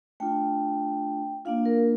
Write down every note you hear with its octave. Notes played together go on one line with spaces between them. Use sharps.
A3 D4 F4 G5
A#3 D4 F4 F5
A#4